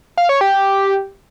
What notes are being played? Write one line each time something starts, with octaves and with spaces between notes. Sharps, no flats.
F5
C#5
G4